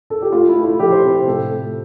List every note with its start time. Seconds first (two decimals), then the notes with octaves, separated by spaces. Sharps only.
0.10 A4
0.22 G4
0.32 A3 F4
0.48 E4
0.56 A3
0.64 E4
0.79 F3 G4
0.91 C5
1.04 C3 C5
1.27 A2 A4
1.51 A3